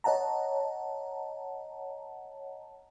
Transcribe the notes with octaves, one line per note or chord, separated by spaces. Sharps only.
C#5 D#5 F#5 A5 A#5